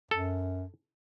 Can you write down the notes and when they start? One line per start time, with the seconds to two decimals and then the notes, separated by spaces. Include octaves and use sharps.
0.11 F#2 A4